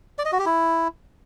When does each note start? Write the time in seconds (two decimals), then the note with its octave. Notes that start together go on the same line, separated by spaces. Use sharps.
0.19 D5
0.25 D#5
0.32 F#4
0.39 G4
0.46 E4